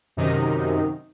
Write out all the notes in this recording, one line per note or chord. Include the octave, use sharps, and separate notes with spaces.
F#2 C3 D#3 D#4